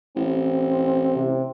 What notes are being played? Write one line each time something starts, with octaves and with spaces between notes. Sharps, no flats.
A1 C4
C3